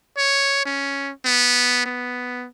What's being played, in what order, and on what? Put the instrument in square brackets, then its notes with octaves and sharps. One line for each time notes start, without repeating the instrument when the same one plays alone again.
[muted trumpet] C#5
C#4
B3
B3